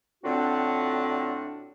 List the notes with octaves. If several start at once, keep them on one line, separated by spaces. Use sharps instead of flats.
A2 D3 C4 D4 F4 F#4